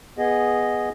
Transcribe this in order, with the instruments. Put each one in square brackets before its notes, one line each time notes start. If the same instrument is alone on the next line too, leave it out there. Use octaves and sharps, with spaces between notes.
[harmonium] B3 G#4 D#5